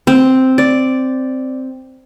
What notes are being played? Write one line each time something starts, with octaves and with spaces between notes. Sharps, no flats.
C4
D5